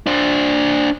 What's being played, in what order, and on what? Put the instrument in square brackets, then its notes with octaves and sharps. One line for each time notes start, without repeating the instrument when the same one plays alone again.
[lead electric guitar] D4 C5